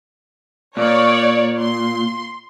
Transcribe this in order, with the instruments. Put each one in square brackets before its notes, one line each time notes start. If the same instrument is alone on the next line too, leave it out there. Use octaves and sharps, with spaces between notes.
[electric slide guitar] A#2 [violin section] C#5 D5
[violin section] C6